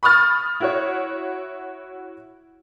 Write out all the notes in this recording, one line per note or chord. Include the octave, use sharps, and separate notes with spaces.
B5 C#6 D#6 F6 A6
E4 F#4 C#5